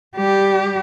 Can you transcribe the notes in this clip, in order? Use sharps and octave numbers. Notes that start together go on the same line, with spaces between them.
G3 G4